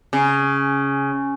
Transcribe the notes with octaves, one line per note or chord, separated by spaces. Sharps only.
C#3